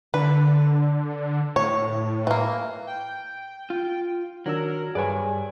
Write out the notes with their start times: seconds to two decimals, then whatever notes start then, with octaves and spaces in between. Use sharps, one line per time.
0.14 D3 B4
1.56 A2 C#5
2.27 E3 A#3
2.87 G5
3.70 F4
4.46 D#3 F#3 D4 A#4 E6
4.95 G2 G#4 B4 C#5 D5 G#5